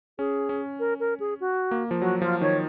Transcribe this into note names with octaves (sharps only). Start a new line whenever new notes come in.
C#4 G#4
C#4
A#4
A#4
G#4
F#4
A#3
F3
F#3 F#4
F3 F4
D#3 C#5